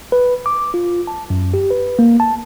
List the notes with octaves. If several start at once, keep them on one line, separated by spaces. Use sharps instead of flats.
B4
D6
F4
A5
F#2
G4
B4
A#3
A5